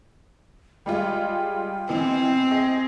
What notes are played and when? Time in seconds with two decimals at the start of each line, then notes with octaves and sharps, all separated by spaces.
0.86 G3 G#3 F4 G5
1.89 B2 E3 C4
2.51 G#4 D#5